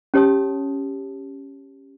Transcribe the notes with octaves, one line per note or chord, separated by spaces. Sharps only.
C#4 G4 C#5 A5 D#6